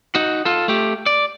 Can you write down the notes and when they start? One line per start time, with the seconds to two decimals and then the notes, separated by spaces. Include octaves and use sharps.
0.15 D#4 F#4
0.45 F4 A4
0.68 A3 G4
1.06 D5